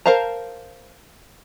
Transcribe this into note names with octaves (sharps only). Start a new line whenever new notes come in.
A#4 C5 F5 A5 A#5